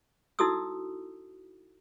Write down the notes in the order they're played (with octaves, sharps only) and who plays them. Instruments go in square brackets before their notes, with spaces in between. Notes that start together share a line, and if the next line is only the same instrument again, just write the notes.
[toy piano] D#4 E4 F#4 A4 D#6 E6